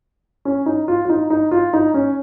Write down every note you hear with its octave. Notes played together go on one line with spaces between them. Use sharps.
C#4
D#4
F4
F4
D#4
D#4
F4
D#4
C#4